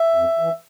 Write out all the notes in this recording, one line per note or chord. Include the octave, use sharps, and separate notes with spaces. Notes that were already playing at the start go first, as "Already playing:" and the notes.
Already playing: E5
F2
E3